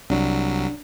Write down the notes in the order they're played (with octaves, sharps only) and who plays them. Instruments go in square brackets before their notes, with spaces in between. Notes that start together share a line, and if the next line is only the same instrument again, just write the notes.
[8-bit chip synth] C2 F#3 [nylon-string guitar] D4